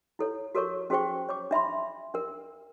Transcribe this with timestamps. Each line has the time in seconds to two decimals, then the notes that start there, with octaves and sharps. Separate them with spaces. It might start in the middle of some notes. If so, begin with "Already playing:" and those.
0.19 E4 A4 C#5
0.55 F#4 A4 A#4 C#5 C#6
0.90 C#4 F#4 G#4 C5 G5 C#6
1.29 C#5 C#6 D6
1.51 D4 E5 B5 C6
2.14 D4 A#4